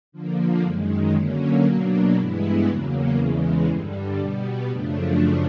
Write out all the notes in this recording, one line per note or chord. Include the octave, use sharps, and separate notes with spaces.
D3 F3 A#3
F#2 D#3 G#3
D3 F#3 A#3 C#4
B2 F#3 A#3 D4
G2 E3 G#3 B3 E4
E2 C#3 F#3 A#3
E2 C#3 E3 G#3
G2 D3 G3
B2 G3 B3
F#2 C#3 F3 A3 D4